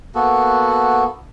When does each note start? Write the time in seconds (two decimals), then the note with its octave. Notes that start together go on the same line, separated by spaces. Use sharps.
0.15 A#3 B3 F#4 A4